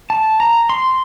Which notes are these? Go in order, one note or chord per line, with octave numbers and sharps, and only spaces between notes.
A5
A#5
C6